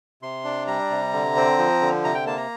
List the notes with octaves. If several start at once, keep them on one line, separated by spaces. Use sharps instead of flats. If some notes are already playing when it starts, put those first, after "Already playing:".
C3 C6
D4
G3 A#5
C3
D3
C4
F3
D3
C3 A#5
G5
A#3 A5
A#5